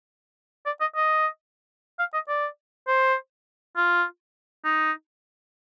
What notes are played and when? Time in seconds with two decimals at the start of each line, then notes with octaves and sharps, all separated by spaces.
0.66 D5
0.81 D#5
0.96 D#5
1.99 F5
2.14 D#5
2.28 D5
2.88 C5
3.76 F4
4.65 D#4